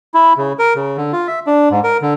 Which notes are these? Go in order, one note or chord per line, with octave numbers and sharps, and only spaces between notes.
E4
C#3
A#4
C#3
D3
F4
E5
D4
G#2
A#4
D3